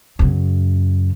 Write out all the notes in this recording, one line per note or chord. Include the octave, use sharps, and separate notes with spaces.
F#2 C#3